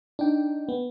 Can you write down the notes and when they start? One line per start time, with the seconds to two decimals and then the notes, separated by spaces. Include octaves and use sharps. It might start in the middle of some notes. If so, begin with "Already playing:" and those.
0.19 D4 D#4 G5
0.69 B3